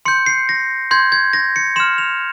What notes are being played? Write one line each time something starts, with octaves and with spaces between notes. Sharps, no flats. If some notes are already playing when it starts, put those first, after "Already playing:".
C6 G6 C#7
C7
A#6
C6 G6 G#6
G#6
A#6
C#7
C6 F6 E7
F7